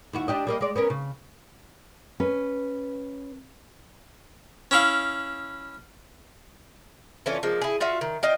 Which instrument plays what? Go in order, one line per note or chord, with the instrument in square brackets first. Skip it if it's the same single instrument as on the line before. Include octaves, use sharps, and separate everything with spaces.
[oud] D#2 E4 F#4
D4 G4 D#5
G3 A#3 D#5
G#3 D5
B3 C#4 A#4
C#3
[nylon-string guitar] C#4 B4
[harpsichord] C#4 E4 F5
[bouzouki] E3 A3 C#4 F4
F3 G#3 A#3
E4 G#4
F4 F#4 E5 F5
D#3
F4 D#5 G5